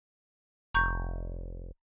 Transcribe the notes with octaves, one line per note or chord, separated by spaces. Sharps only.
F1 A#5 C#6 G6